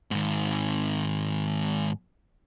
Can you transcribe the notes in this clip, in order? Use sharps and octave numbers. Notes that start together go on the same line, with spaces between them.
G#2 D#3